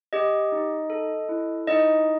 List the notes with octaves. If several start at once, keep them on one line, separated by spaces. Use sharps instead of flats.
G4 D#5
D#4
A4
E4
D#4 D#5